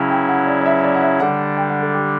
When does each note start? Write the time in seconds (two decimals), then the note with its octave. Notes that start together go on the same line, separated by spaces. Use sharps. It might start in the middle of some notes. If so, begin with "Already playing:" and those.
Already playing: C#3 F#3 C#4 E4 G5 A5
0.10 G5
0.29 F#5
0.47 D5
0.61 D5
0.66 E5
0.84 D5
0.95 F#5
1.02 E5
1.20 D3 G3 D4 F#5
1.57 G5
1.69 F#5
1.82 A4
1.94 G4